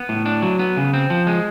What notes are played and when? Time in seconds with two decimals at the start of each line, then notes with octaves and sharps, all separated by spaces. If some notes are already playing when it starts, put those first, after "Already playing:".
Already playing: B3
0.09 A2
0.25 D4
0.42 F#3
0.59 B3
0.77 C#3
0.94 C4
1.10 F3
1.27 G#3